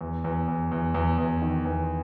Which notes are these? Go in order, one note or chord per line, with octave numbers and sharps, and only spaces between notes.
E2
E2
E2
E2
E2
E2
D#3
E2